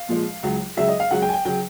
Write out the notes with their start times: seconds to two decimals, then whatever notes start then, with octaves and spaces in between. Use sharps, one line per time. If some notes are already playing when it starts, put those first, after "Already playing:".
Already playing: F5
0.09 A#2 F3 G#3
0.43 C#2 C#3 F#3
0.77 C#2 C#3 F#3 E5
0.88 D#5
1.00 F5
1.11 C#2 C#3 F#3 F#5
1.22 G5
1.29 G#5
1.33 G5
1.45 C#3 F#3 G5